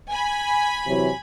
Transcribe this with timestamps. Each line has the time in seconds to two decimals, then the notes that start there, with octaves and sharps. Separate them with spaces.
0.11 G#5 B5
0.87 C3 E3 F#3